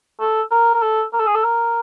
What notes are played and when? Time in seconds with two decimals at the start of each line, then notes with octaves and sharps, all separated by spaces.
0.20 A4
0.51 A#4
0.74 A#4
0.82 A4
1.13 A#4
1.20 A4
1.27 G#4
1.35 A4
1.44 A#4